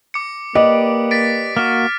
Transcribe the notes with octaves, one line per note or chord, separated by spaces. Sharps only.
D6 C#7
A#3 G4 B4 D5 D#5
A6 B6 D7
A#3 F#4 D6 F6